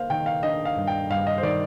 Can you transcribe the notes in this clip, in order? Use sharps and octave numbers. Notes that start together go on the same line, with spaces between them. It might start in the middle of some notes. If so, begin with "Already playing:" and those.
Already playing: A#3 C5 F5
D#3 G5
F5
D4 D#5
F5
G2
G5
G2 F5
D#5
C5
D#3 D5